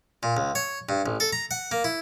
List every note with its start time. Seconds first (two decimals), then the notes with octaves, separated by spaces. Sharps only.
0.23 A#2
0.37 C#2
0.55 C#5
0.89 G2
1.06 A1
1.20 A4
1.33 A#5
1.51 F#5
1.71 A#3
1.84 E4